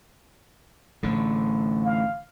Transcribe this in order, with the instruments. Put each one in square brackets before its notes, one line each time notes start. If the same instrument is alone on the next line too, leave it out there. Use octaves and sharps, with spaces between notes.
[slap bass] A1 D3
[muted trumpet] F5